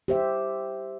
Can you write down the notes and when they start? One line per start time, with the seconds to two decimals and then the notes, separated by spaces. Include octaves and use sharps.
0.08 G4 C5 E5